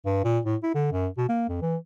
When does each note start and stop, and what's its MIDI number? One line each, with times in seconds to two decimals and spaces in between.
0.06 0.23 43
0.24 0.40 46
0.45 0.56 45
0.63 0.73 64
0.75 0.89 50
0.93 1.08 42
1.18 1.26 47
1.29 1.48 58
1.49 1.57 41
1.62 1.77 52